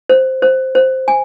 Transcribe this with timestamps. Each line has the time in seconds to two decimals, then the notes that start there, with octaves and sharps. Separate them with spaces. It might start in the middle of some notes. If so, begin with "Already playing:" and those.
0.09 C5
0.42 C5
0.75 C5
1.08 G#5